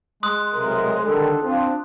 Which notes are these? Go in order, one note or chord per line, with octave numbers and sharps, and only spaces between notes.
G#3 C6 D#6 F#6
B1 C3 A#4
D3 D#3 G3 A4
C4 D4 F4